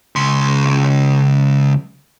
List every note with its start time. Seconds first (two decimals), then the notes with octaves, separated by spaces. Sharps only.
0.16 C#2 C6